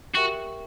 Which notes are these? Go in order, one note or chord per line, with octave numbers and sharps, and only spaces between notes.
F#4 G4 A#4 E5 G5 C#6